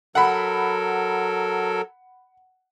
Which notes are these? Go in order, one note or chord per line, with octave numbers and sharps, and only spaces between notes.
F#3 A4 A#4 F#5 B5